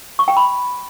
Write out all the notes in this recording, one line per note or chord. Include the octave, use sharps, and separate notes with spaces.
C#6
G5
B5